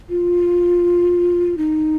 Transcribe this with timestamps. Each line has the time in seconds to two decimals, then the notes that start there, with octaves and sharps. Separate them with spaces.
0.10 F4
1.57 D#4